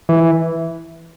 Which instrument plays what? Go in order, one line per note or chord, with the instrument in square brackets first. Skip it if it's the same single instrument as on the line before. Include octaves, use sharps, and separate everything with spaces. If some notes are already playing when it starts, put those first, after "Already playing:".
[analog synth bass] E3